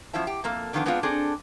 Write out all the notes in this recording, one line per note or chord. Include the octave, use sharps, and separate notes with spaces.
F#2 F3 E4 E5 A5
G4
F2 A#3 A4
D3 D#3 F3 F#3 B3 D4
G#3 B3 C4 D4 F4
C4 D4 G#4 A4